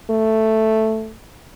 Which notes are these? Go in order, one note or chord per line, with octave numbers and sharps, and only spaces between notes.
A3